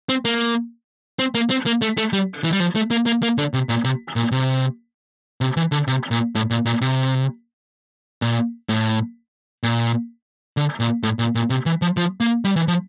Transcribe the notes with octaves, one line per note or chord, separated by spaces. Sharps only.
C4
A#3
C4
A#3
C4
A#3
A3
A3
G3
E3
G3
F3
A3
A#3
A#3
A#3
D3
C3
A#2
C3
A#2
C3
C3
E3
D3
C3
A#2
A2
A#2
A#2
C3
A#2
A2
A#2
D3
A#2
A2
A#2
A#2
C3
E3
F3
F3
A#3
G3
E3
F3